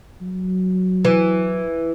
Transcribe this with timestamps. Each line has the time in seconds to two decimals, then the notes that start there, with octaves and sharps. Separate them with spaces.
0.21 F#3
1.05 E3